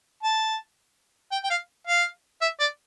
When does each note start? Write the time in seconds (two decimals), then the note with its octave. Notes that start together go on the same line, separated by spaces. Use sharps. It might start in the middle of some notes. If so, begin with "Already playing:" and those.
0.23 A5
1.32 G5
1.44 G5
1.50 F5
1.87 F5
2.41 E5
2.60 D5